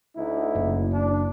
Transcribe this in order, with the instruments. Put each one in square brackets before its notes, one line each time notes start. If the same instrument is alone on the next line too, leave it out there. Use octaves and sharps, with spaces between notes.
[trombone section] D2 D#4 E4
[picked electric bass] F#1
[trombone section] D4